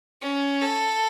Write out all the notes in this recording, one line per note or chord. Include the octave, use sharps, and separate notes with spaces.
C#4
A4